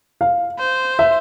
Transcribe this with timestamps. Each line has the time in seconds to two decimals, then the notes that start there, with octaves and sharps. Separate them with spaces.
0.21 F5
0.59 C5
0.99 E5